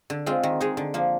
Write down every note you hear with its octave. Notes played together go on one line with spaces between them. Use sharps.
D3
G#3 C4 F4
D#3
G#3 D#4 G#4
D3
F3 A#3